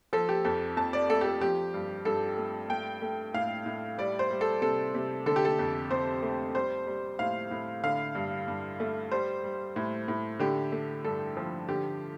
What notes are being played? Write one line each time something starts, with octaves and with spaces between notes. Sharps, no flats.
F3 A4
G4
F2 A4
F2 A5
D5
A3 A4
G4
A4
F3 G4
G2
G2 A4
A3
A3 G5
A3
A2 F5
A2
G3 D5
C5
G3
A4
C3 A4
C3
D3 A4
G4
A4
F2
F2 C5
A3
G3 C5
G3
A2 F5
A2
D3 F5
G2
G2
A3
G3 C5
G3
A2
A2
D3 G4
A3
G2 A4
F3
D3 G4